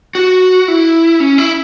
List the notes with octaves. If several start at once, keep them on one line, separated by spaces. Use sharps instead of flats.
F#4
E4
C#4
E4